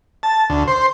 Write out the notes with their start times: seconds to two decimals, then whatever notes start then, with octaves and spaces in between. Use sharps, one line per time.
0.23 A5
0.50 D2
0.68 C5